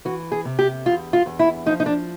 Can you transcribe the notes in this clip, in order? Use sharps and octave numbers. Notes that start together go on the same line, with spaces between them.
E3 F#4
G#4
C3
G4
E2 F4
F4
E2
E4
F3 D#4
D#4
D4